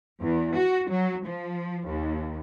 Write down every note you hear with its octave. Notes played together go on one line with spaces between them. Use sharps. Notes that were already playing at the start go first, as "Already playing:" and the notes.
E2
F#4
F#3
F3
D#2